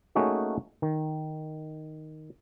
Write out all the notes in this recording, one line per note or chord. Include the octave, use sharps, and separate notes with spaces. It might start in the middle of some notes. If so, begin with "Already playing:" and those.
A3 A#3 C#4 D#4 F#4 G#4
D#3